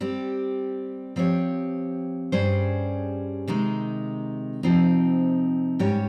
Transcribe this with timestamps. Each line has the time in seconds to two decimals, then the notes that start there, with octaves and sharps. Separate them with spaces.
0.01 G3 C4 G4
1.16 F3 C4 G4 C#5
2.32 G2 G3 C#4 G#4 C5
3.48 C3 D#3 G#3 D#4
4.63 C3 F3 C4 D#4
5.79 G#2 G3 C#4 G4 C#5